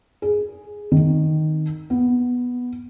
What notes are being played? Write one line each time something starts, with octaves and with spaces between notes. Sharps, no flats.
G#4
D#3
B3